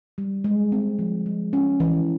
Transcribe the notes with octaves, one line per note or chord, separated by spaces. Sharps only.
G3
G#3
C4
F3
G#3
C#4
E3